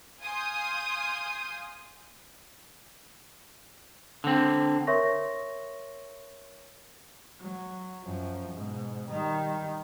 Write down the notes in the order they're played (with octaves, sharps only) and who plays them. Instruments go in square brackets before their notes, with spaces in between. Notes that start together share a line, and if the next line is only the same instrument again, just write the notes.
[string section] F5 G#5 C6 D#6 G6
[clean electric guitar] D3 C4
[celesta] A#4 C#5 E5 C6 C#6 A#6
[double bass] F#3
F#2 F3
G#2 B2
D#3 G3